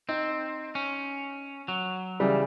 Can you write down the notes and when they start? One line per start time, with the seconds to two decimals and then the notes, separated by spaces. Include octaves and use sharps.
0.09 C4 D#4
0.75 C#4
1.68 F#3
2.20 C#3 E3 G3